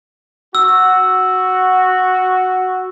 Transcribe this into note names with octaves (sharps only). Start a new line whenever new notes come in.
F#4 E6